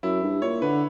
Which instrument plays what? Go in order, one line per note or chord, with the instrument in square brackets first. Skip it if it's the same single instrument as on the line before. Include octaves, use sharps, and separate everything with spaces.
[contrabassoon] F#2 [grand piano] E4
[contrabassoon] G2
[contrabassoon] A#2 [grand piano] C#5
[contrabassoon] D3 [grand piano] B4